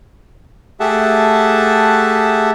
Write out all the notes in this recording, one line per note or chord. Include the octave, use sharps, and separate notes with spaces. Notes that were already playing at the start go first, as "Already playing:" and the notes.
A3 G4 G#4 E5 F#5 A5